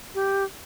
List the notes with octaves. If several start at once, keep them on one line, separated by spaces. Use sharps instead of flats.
G4